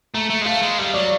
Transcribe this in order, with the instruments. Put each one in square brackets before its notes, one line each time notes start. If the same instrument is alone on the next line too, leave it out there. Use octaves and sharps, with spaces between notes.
[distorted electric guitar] A3 [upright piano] A#5
[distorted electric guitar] A3
G#3
[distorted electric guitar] A3 [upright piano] F5
[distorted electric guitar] G#3
[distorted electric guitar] G3 [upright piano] F5
[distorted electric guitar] F#3 [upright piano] D5